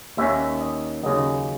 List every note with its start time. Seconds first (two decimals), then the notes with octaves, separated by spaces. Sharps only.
0.17 D#2 D#3 A#3 C#4 E5
0.61 D#5
1.03 D#2 C#3 F#3 D#5